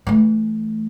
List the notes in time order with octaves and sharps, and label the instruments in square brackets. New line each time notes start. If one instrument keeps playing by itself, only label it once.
[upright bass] E3 A3